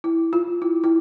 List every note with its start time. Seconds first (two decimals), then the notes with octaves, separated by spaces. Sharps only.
0.04 E4
0.33 F4
0.62 E4
0.84 E4